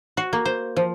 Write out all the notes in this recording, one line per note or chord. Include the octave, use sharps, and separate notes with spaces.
F#4
A#3
C5
F3